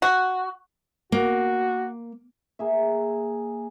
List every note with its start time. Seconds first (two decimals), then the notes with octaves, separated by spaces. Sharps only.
0.02 F#4
1.12 A#3 F#4
2.59 A#3 G#4 E5